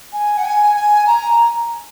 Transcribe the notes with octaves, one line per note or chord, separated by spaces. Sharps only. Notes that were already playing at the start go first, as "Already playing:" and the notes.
G#5
F#5
G#5
G#5
A#5